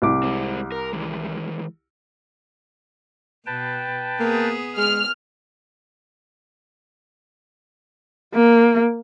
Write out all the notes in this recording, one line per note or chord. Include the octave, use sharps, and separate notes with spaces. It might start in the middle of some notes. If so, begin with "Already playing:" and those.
C2 D6
G#3 C4
A#4
D#3 E3 G#3
B2 B4 G5 A5
A#3 B3 G#4
G#3 F6
A#3